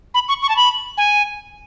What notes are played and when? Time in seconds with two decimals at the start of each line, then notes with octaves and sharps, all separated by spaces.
0.14 B5
0.28 C#6
0.42 C#6
0.49 A5
0.56 B5
0.98 G#5